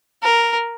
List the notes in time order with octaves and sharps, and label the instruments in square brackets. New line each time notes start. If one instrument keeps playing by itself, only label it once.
[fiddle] A#4